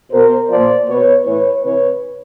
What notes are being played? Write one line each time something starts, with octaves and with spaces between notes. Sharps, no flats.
B2 A#4 C5
A#2 F3 C5 D5
B2 B4 C#5
A2 E3 B4 C#5
C3 E3 B4 C#5